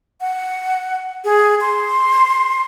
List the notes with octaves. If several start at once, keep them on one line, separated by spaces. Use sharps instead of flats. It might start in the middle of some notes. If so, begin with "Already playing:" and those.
F#5
G#4
C6